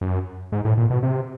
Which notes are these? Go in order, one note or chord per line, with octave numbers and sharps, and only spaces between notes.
F#2
G#2
A2
A#2
B2
C3